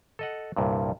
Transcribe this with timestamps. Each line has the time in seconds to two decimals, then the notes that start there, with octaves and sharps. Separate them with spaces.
0.19 A4 D#5 F#5
0.56 C2 G2 A#2